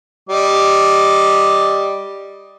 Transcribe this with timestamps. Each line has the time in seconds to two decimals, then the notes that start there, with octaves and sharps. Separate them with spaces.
0.29 G3 D#5 D6